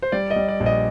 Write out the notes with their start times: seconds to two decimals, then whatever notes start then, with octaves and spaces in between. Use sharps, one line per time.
0.02 C5
0.12 G3 D5
0.30 D#5
0.36 G3
0.48 D5
0.60 A#1
0.66 D#5